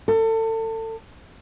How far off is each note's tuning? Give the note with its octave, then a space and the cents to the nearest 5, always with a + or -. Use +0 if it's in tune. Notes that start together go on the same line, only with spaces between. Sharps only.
A4 +30